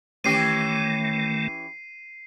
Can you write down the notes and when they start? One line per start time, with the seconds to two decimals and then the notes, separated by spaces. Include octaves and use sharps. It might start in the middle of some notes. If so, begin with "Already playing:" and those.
0.24 D#3 E3 A3 C#4 G4 C7 D#7